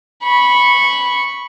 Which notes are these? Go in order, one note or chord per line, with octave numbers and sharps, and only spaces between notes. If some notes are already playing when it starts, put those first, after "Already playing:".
B5 C#6